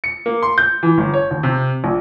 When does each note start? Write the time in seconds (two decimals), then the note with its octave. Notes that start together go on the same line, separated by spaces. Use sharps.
0.04 C#7
0.26 A#3
0.43 C6
0.58 G6
0.83 E3
0.98 G1
1.14 C#5
1.31 D#2
1.43 C3
1.84 A#1